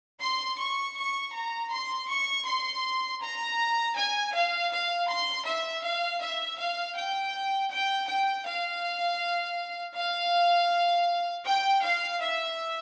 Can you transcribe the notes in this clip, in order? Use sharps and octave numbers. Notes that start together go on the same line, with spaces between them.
C6
C#6
C#6
A#5
C6
C#6
C6
A#5
G#5
F5
F5
C6
E5
F5
E5
F5
G5
G5
G5
F5
F5
G5
F5
E5